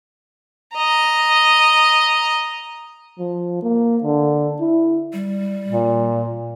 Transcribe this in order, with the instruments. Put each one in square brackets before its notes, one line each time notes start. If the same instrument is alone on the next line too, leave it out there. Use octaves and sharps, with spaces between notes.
[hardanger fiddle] D#5 A#5
[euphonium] F3
A#3
D3
E4
[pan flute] G3
[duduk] A#2